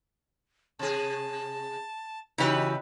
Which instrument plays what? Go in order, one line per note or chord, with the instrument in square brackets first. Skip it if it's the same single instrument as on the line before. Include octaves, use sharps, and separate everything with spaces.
[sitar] C3 G#4 [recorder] A5
[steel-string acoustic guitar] C#3 E3 [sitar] D#4 G4 B4 [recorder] F#4